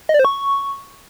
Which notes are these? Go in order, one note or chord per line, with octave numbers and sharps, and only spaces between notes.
D#5
D5
C5
C#6